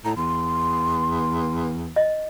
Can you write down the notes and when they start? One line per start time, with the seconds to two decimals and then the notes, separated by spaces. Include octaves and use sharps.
0.05 A2 A#5
0.17 E2 C6
1.96 D#5